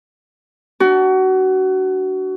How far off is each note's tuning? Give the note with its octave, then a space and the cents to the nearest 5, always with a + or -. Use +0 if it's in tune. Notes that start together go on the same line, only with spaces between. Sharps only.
D4 +0 F#4 +25